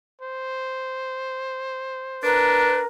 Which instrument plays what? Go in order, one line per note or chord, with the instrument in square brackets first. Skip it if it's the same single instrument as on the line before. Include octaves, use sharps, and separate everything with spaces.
[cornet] C5
[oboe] D4 [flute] A#4 [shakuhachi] B4